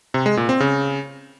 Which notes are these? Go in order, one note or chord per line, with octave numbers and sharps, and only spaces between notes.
C3
G#3
A#2
C4
C#3